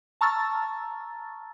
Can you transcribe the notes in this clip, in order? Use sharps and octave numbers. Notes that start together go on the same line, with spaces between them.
A5 A#5 C#6 E6 F6 A6